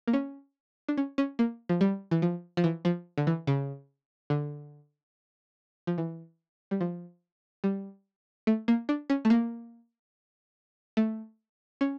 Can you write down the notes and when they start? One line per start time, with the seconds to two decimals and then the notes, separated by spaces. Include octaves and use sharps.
0.08 A#3
0.13 C#4
0.88 D4
0.97 C#4
1.18 C#4
1.39 A#3
1.69 F3
1.81 G3
2.11 E3
2.22 F3
2.57 F3
2.64 E3
2.85 F3
3.18 D3
3.27 E3
3.47 C#3
4.30 D3
5.87 F3
5.98 E3
6.71 G3
6.81 F3
7.64 G3
8.47 A3
8.68 A#3
8.89 D4
9.10 C#4
9.25 A3
9.30 A#3
10.97 A3
11.81 C#4